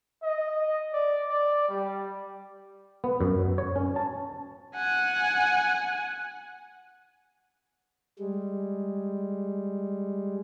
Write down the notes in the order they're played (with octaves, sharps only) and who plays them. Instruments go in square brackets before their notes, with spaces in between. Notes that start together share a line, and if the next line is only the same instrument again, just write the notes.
[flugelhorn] D#5
D5
D5
G3
[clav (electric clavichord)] B3
F#2
C#5
C#4
A5
[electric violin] F#5 G#5
[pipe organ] G3 G#3